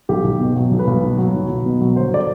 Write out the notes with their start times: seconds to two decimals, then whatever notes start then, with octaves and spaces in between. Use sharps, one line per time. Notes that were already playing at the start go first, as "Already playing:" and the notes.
0.09 B1 G4
0.24 B1
0.40 B2
0.56 F#3
0.71 B1
0.79 B4
0.87 B1
1.03 B2
1.18 F#3
1.34 B1
1.49 B1
1.65 B2
1.81 F#3
1.96 G1 C5
2.14 D5